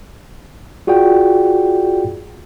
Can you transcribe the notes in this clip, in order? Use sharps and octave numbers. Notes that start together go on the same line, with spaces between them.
F4 F#4 G#4 D5 G5